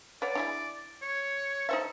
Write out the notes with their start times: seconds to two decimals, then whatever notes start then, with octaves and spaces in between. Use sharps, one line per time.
0.22 B4 C#5 D5 F#5
0.35 D4 E4 G#4
1.02 C#5
1.69 D#4 A4 C5 E5